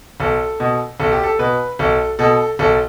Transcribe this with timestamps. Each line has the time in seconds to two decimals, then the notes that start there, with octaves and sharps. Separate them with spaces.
0.20 B1 A4
0.60 B2
1.00 B1 A4
1.12 G4
1.23 A4
1.39 B2 B4
1.79 B1 A4
2.19 B2 A4
2.59 B1 A4